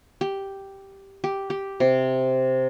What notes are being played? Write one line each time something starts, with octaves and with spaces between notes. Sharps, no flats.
G4
G4
G4
C3